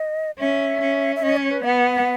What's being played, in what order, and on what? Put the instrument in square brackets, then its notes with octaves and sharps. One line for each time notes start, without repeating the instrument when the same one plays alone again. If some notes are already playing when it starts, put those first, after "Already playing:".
Already playing: [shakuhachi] D#5
[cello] C#4 [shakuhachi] E5
[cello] C#4
[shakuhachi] E5
[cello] C#4 [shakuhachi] D#5
[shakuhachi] C#5
B4
[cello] B3 [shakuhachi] F#5